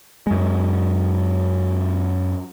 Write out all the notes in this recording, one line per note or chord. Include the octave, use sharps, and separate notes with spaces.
F#2 G#3